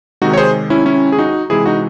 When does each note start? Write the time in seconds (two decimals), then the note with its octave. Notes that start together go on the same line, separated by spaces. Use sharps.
0.22 C3 D#3 G#3 D#4 F#4
0.33 C#5
0.38 G#4 C5
0.70 C#4 E4
0.86 C#4 E4
1.12 G#4
1.19 D#4 F#4
1.50 C3 E3 G#3 E4 G#4
1.66 D#4 F#4